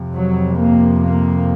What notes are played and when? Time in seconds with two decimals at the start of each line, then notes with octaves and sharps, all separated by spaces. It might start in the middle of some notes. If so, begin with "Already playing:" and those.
Already playing: F2 C3
0.16 F#3
0.59 A#3
1.04 A#3